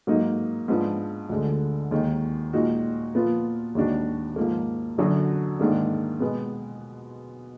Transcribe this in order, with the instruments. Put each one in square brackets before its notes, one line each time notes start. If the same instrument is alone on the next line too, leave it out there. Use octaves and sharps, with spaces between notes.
[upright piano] G#2 F#3 A#3 D#4
G#2 F3 B3 D4
D2 D3 G#3
D#2 D#3 G#3 D#4
A#2 G#3 D#4 F#4
A#2 F3 B3 F4
D#2 D#3 G#3 D4 F#4
G#2 F3 A#3
F#2 D3 F#3 D4 F#4
G#2 D#3 A#3 D4
B2 G#3 B3